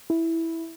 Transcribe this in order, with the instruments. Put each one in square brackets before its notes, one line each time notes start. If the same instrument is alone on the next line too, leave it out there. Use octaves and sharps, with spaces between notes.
[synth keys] E4